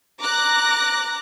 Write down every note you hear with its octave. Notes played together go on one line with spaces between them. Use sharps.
A#5 D6 F#6 A#6